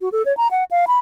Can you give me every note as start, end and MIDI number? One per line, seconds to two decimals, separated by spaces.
0.01 0.09 66
0.12 0.23 69
0.26 0.35 73
0.37 0.48 82
0.51 0.64 78
0.71 0.85 77
0.87 0.99 83